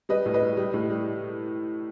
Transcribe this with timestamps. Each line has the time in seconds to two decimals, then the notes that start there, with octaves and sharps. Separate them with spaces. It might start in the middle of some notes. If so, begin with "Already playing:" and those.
0.09 G3 B4 D#5
0.26 A2
0.34 B4 D#5
0.42 G3
0.57 G3
0.74 A2
0.90 G3